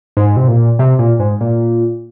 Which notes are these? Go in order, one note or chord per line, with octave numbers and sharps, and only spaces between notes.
G#2
C3
A#2
C3
A#2
G#2
A#2